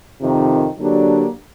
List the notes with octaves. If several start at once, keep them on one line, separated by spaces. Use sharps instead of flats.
F2 C3 D#3
D3 F#3 A#3 D4 G4